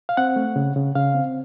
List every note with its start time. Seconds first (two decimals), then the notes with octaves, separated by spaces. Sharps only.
0.09 F5
0.17 C4 F#5
0.36 A3
0.56 C#3
0.76 C#3
0.95 C#3 F5
1.15 C4